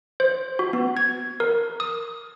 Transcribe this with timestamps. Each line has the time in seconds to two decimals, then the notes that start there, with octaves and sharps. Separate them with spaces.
0.20 C5
0.59 F#4
0.73 B3
0.97 G#6
1.40 A#4
1.80 D#6